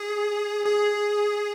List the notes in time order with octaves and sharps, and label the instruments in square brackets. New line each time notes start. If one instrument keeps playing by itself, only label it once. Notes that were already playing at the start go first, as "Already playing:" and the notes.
Already playing: [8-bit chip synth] G#4
G#4